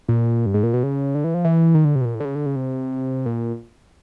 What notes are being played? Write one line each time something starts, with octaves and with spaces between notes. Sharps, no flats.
A#2
G2
G#2
A#2
B2
C#3
D3
E3
F3
E3
D#3
D3
C3
B2
A#2
A2
D3
C#3
D3
C#3
C3
A#2